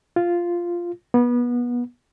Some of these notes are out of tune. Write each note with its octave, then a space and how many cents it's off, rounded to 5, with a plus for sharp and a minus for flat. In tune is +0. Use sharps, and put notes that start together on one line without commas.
F4 -5
B3 -25